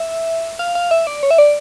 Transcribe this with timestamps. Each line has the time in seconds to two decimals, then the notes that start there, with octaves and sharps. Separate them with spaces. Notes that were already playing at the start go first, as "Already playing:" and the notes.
Already playing: E5
0.59 F5
0.75 F5
0.91 E5
1.07 D5
1.23 C#5
1.31 E5
1.38 D5